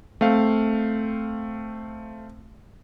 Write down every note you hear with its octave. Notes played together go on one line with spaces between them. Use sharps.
A3 C4 F5